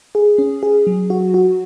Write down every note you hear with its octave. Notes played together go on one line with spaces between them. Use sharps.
G#4
C#4
G#4
F#3
F#4
F#4